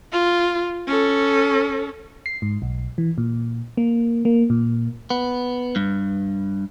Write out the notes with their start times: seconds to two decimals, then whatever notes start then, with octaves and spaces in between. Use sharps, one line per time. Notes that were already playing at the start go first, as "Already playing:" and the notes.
0.13 F4
0.88 C#4 A4
2.26 C7
2.42 G#2
2.62 B1
2.98 E3
3.18 A#2
3.77 A#3
4.25 A#3
4.50 A#2
5.10 B3
5.76 G2